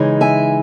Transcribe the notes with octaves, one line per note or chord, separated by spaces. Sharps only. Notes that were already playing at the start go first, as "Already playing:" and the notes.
Already playing: C#3 E3 G#3 D#4
E5 G#5